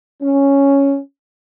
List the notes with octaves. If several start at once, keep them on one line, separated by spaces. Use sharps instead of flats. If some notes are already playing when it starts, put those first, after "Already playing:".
C#4